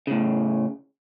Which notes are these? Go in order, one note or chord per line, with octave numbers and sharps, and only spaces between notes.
A2 C#3